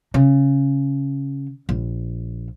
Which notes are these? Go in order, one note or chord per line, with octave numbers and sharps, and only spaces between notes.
C#3
A#1